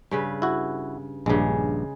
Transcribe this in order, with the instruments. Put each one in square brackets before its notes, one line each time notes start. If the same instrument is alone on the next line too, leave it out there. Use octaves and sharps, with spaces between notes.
[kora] G2 C#3 B4
[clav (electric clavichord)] E4 F#4
[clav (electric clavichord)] A#1 G2 [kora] C#3 G#3